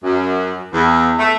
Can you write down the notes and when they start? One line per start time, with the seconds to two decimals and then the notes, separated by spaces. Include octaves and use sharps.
0.03 F#2
0.73 E2
1.18 A3